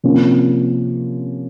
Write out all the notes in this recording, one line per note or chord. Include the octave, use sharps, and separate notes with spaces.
C3 F3 A#3 C#4